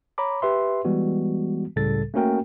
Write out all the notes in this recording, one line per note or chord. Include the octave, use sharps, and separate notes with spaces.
C#5 A#5 B5 D6
G4 B4 E5 C6
E3 G3 G#3 B3 F#4
C#2 A2 C#3 G3 A4 A6
A3 A#3 C#4 F#4 A#4 G5